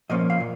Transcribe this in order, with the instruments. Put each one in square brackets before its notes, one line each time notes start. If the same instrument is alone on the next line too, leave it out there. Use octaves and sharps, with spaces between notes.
[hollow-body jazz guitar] A#2 F3 A#3 C#4 D#5
F5
A#2